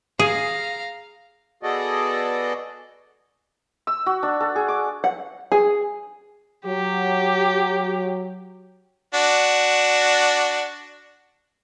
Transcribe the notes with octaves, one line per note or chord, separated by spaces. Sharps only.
G#4 F5 A#5
B3 F#4 G#4 A4 D5 D#5
E6
F#4
D4
A4
G#4
D6
F#5
G#4
F#3 G4
D4 F#4